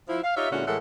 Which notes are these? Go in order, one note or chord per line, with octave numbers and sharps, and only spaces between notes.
F3 E4
F5
D#4 F4 G4 C#5 E5
A#2 D3 G#3 C#4 E4 F#4
A2 E3 G#3 A4 A#4 F#5